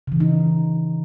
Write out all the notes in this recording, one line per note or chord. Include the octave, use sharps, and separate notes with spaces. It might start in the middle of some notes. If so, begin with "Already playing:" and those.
A#2 C#3 E3 D#4